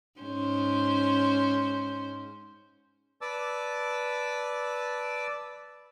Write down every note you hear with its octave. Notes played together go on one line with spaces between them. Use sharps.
G#2 C#4 C5
B4 D5 A5 D6 E6